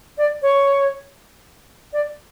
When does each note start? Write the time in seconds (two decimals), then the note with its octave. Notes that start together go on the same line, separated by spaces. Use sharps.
0.18 D5
0.42 C#5
1.93 D5